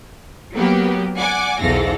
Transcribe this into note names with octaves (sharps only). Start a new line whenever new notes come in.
F#3 A#3 B3 G4
D5 F#5 G#5 D6
B1 E2 G#2 A4 F5 A#6